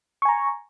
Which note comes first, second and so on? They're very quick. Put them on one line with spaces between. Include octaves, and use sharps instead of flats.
C#6 G#5 A#5